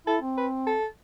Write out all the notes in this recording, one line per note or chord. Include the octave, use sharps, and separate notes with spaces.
E4 A4
C4
B4
A4